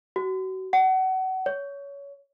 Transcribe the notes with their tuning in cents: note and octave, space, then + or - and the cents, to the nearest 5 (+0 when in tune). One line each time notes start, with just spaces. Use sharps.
F#4 +30
F#5 +30
C#5 +20